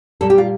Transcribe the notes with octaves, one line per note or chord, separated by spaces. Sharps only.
A#2 G3 A4
G4
F4